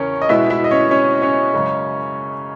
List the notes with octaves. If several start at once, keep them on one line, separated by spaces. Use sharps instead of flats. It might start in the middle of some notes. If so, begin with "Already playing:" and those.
Already playing: E2 C#3 C#4 A#4 C#5
D#5
B2 G#3 B3 E4 E5
E4 E5
D#5
C#4 C#5
C#4 C#5
C#4 C#5
F#2 C#3 G#3